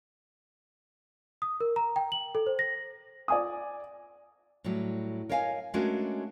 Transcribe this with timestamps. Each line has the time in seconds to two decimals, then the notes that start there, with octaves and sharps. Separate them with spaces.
1.42 D#6
1.60 A#4
1.76 A#5
1.96 G5
2.12 F#7
2.35 A4
2.47 C5
2.59 A#6
3.28 D5 G#5 D#6
4.64 A2 F#3 G3
5.29 A#4 C#5 D#5 F5 F#5 G#5
5.74 G#3 A3 C#4 D4 F#4 A#4